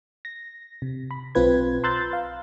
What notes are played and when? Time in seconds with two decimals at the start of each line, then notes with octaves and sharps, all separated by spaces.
0.25 A#6
0.82 C3
1.11 B5
1.35 B1 C4 F4 B4 G#6
1.83 A#5 C6 E6 F#6 G6 A6
2.13 F5